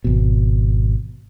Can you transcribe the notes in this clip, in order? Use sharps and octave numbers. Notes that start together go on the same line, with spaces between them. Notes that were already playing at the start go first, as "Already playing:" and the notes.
G#1 B2